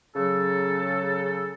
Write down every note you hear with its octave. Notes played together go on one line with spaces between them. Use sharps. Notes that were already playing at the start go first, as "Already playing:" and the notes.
C#3 F#3 A4